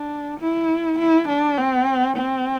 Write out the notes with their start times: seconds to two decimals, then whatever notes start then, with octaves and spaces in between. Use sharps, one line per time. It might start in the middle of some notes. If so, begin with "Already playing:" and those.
Already playing: D4
0.40 E4
0.99 E4
1.28 D4
1.57 C4
2.16 C4